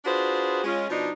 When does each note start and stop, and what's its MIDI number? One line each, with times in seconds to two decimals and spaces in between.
0.05 0.60 62
0.05 0.60 65
0.05 0.60 66
0.05 0.60 68
0.05 0.60 71
0.05 0.60 72
0.64 0.86 56
0.64 0.86 61
0.64 0.86 65
0.90 1.10 47
0.90 1.10 53
0.90 1.10 62
0.90 1.10 63